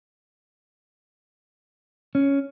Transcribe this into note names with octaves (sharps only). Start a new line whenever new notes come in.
C#4